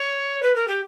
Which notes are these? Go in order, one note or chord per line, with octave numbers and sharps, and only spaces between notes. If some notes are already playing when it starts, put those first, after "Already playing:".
Already playing: C#5
B4
A#4
G4